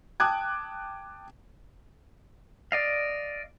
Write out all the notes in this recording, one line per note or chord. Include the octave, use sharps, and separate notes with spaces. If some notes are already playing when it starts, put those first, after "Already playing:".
G5 A5 D6 D#6 F#6 G#6
D5 D#5 F5